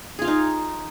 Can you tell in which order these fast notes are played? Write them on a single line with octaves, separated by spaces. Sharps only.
G#4 F4 F5 D#4